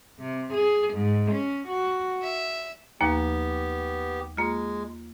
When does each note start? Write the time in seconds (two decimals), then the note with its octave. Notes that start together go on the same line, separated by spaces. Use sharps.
0.18 C3
0.55 G#4
0.93 G#2
1.32 C#4
1.68 F#4
2.23 E5
3.01 D#2 F3 A#3 B3 G4
4.37 G#3 A#3 F4